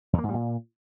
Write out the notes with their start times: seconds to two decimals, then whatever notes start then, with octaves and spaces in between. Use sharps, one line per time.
0.13 E2
0.18 A#3
0.23 G#2
0.29 G3
0.34 A#2